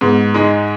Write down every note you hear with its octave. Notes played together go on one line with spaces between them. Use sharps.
G#2 B3
G#3 D#4